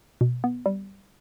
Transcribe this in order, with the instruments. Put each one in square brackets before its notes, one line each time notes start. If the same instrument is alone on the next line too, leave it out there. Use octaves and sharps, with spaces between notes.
[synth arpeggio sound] B2
B3
G3